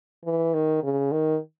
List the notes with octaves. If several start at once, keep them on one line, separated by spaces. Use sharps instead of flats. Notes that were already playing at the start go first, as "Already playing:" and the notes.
E3
D#3
C#3
D#3